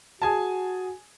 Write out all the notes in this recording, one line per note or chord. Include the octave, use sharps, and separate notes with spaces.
F#4 G#4 G#5 A5